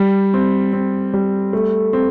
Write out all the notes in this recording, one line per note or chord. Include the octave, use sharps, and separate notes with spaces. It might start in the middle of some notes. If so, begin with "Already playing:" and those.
Already playing: G3
C4
C4
G3
A3
C4